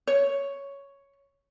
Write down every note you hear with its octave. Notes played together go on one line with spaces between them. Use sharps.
C#5